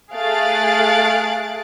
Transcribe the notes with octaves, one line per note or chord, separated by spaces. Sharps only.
A3 G#4 F5 F#6 A6 D7